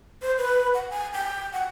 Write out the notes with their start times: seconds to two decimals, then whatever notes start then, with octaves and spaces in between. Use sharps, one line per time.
0.22 C5
0.38 B4
0.74 F#5
0.90 G#5
1.13 G5
1.53 F#5